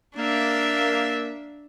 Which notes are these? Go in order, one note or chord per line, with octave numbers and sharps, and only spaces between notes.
A#3 D4 E5